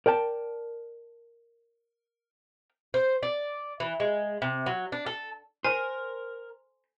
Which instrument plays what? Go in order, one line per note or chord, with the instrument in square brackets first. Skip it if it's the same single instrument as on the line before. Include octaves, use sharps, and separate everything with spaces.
[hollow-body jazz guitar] A#4 D5 G5 A5
[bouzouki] C5
D5
E3
G#3
C3
F#3
D4
A4
[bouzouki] A#4 [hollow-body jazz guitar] C5 [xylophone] G#5